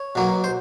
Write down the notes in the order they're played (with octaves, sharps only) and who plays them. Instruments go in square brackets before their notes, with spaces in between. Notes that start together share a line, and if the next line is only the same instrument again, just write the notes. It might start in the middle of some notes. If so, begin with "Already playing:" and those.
Already playing: [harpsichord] C#5
B2 F#3 A#3
C5